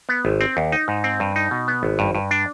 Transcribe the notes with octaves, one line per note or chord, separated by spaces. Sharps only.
B3
G#1
C4
D#2
D#4
G#2
C4
G2
D#4
B2
B3
G#1
G2
G2
D4